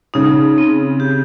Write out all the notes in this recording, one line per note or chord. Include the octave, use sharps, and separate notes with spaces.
C#3 D#4
C4
G4